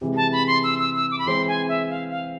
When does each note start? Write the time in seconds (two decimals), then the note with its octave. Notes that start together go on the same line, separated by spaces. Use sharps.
0.01 C3 E3 G#3
0.16 A5
0.32 B5
0.47 C6
0.64 E6
0.79 E6
0.95 E6
1.11 D6
1.19 B5
1.26 E3 G#3 C4 C6
1.48 G#5
1.69 E5
1.90 F5
2.11 F5